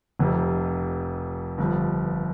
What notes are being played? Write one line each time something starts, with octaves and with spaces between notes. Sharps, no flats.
F1 F2 C3
G1 G2 F3